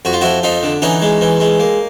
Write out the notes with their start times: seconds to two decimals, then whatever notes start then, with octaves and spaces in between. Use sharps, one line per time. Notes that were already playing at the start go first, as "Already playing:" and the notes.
0.05 F2 F#4
0.13 F4
0.21 F3 E4 F#4
0.43 F2 D#4 F4
0.63 D3
0.82 E3 C#4 D#4
1.02 G#3
1.21 E3
1.40 G#3
1.60 A#3